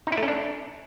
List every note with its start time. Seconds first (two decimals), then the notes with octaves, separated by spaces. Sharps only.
0.07 D#4
0.12 E4
0.17 A3
0.23 C#4
0.28 D4